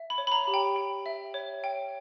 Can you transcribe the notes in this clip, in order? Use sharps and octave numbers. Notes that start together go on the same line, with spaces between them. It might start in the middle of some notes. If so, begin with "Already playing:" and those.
Already playing: E5
B5
C#5
B5
A#5
G4
G5
G5
E5
C#5
G5